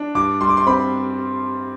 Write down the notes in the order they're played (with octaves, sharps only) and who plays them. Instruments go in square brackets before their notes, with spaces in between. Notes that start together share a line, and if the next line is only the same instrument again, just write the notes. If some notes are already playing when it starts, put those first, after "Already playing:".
Already playing: [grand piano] D4
G2 D6
G3 C6
D6
C6
C4 B5